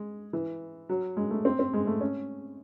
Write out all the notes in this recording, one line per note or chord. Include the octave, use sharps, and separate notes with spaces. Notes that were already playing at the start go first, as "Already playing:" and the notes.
Already playing: G#3
E3
F#3
G#3
A3
C4
C4
G#3
A3
C#4